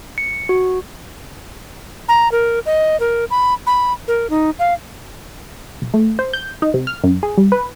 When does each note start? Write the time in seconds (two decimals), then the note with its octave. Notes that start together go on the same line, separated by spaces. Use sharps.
0.18 C#7
0.49 F#4
2.08 A#5
2.32 A#4
2.66 D#5
3.00 A#4
3.30 B5
3.67 B5
4.08 A#4
4.30 D#4
4.59 F5
5.82 B1
5.94 A3
6.19 C5
6.33 G6
6.62 D#4
6.74 C3
6.87 F6
7.04 F#2
7.23 G#4
7.37 G3
7.52 B4